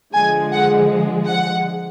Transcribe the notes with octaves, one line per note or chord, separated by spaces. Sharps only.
D3 F3 G#3 G#5
F#5
F#5